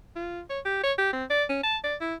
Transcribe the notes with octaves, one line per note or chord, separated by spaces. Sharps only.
F4
C#5
G4
C#5
G4
C4
D5
C#4
A5
D5
E4